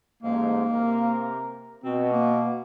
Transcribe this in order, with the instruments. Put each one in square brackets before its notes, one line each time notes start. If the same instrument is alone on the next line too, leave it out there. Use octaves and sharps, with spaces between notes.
[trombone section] A1 E2 G#2 [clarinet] A#3
[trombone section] C3 A#4
[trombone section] B2 [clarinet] C4
[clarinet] A#3